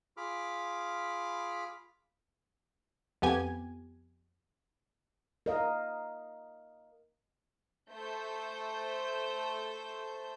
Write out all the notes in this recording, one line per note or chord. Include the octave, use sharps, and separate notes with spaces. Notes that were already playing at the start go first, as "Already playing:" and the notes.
F4 G#4 B5 D6 F6
F2 B3 G4 G#5 G#6
A#4 D#5 F5
A3 C5 G6